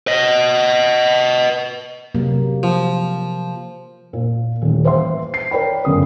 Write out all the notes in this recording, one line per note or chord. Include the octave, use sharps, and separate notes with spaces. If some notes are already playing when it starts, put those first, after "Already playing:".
B4 D#5
C3 F#3 A#3
F3
A#2
D#1 A1
B4 C5 E5 C6
C7
A#4 B4 C#5 D5 G5 B5
G1 F#2 C#3 D#6